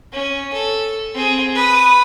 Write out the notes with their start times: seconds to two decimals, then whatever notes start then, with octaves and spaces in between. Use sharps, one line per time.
0.12 C#4
0.53 A4
1.14 C4 G#4
1.55 B4 D#6